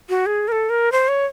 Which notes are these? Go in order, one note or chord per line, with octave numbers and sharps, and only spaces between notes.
F#4
G#4
A#4
A4
A#4
C5
C#5